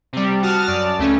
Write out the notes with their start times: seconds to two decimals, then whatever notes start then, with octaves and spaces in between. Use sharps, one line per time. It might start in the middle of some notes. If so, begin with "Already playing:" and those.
0.13 C3 G3
0.42 F#4 A5 D#6 F6
0.67 F#2 D5 A5
0.98 C#2 A3 C#4